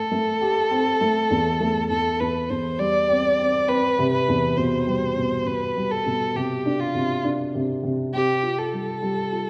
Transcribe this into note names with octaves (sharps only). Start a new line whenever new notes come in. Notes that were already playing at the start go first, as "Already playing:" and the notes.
Already playing: A3 A4
A3
G4
C4
A3
E2
A3
E2 A4
E2 B4
E2 C5
G3 D5
C4
C4
C4 B4
C3
B4
E2
B2 C5
G3
B2
B2 B4
G3
A4
B2
C3 G4
D4
F4
C3
D4
C3
C3
C4 G4
F4
A4
G3
G3
F4